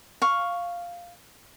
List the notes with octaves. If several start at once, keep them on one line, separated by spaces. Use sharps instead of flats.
F5 C#6